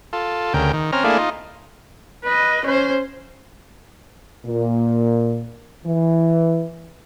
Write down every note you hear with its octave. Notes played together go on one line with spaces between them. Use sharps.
F4 A4
D2 C#3 A#4 G5
D#3
C4 C#4 A#5 F6
A3 A#3 D4 E4 G#4 F5
D#4 F4
B4 D#5
C#4 C5
A#2
E3